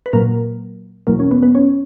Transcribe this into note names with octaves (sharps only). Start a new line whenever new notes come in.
B4
A#2 F#3 A#3 A#4
E2 B2 F#3 A#3 A#4
C#4 C#5
B3 B4
B3 B4
C#4 C#5